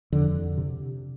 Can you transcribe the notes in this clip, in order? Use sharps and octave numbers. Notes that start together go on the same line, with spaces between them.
F2 D3
C3